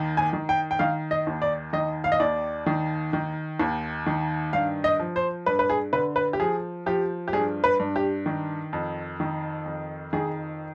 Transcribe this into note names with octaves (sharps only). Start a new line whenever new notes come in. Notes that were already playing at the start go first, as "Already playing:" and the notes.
Already playing: D#2 D#3
G#5
D#3
G5
G5
D#3 F5
D#5
D#2
D5
D#3 D#5
F5
D#5
D#2 D5
D#3
D#3
D#2
D#3
G2 F5
D#5
F3
C5
G2 B4
B4
G#4
D3 B4
B4
G4
F3 G#4
F3 G4
G4
G2 G#4
B4
G2
G4
D#3
F2
D#3
F2
D#3 G#4